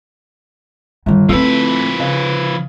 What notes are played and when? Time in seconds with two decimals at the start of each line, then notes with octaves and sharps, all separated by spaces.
1.06 G1 D#3 G3
1.29 F3 A3 C4 D#4 E4 B4 E6
1.99 C#3